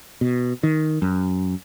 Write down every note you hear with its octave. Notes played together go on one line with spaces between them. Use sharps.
B2
D#3
F#2